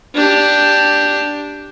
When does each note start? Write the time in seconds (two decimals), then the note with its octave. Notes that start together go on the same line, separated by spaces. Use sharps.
0.15 D4 G4